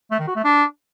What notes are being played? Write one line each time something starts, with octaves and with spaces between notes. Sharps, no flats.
A3
D#3
F#4
A3
D4